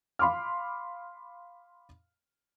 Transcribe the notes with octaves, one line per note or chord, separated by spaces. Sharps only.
F5 B5 C6 D6 F6